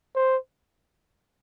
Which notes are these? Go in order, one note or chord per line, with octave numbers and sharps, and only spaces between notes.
C5